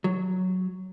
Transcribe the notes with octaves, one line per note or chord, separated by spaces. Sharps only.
F#3